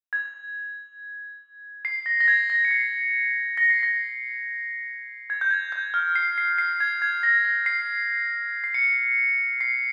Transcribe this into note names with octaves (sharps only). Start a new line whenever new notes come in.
G#6
C7
A#6
A#6
G#6
A#6
C#7
C7
A#6
C7
A#6
G#6
G6
G#6
G6
F6
C7
C7
C7
G#6
G#6
A#6
A#6
C7
C7
C#7
C7